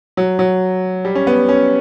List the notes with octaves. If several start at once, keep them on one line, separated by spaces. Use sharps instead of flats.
F#3
F#3
G3
C#4
B3
C#4